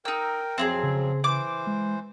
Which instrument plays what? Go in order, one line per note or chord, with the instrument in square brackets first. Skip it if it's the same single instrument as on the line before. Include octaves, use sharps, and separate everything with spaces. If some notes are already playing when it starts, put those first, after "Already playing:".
[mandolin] D#4 E6 [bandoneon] A#4 G5
[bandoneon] F2 F3 F#3 [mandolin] C4 E4 G#4 [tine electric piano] G5
[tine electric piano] C#3
[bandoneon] E3 C5 [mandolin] D6
[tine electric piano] G#3